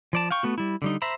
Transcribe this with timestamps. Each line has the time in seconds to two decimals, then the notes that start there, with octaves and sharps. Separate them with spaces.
0.13 F3 D5 A5
0.31 F5 G5 C#6
0.43 A3 B3 F#4
0.58 G3 E4
0.82 D3 G3 D#4
1.02 C5 E5 A#5 B5